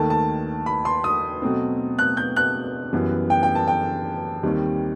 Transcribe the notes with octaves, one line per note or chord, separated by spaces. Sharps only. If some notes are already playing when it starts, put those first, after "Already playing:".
Already playing: D#2 D#3 A3 A5
A5
B5
C6
D#6
B2 F#3 A3 C4
F#6
G6
F#6
F#2 E3 G3 B3
G5
G5
A5
G5
D#2 D#3 G3 C4